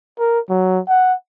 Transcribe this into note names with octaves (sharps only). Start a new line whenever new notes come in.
A#4
F#3
F#5